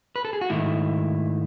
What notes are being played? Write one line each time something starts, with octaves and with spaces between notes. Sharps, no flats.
B4
A4
G#4
F#4
G#2 D#3 A3 E4